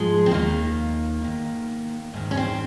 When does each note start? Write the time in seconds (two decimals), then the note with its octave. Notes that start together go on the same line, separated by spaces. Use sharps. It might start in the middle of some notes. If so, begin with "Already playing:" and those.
Already playing: G#2 F3 G#3
0.26 C4
0.31 D#2 D#3 A#3
1.22 G#2 D#3
2.14 G#2 D#3
2.31 C#4
2.37 C4